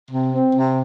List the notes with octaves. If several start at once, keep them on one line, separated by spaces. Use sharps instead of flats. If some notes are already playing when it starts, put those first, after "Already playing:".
C3
C4
C3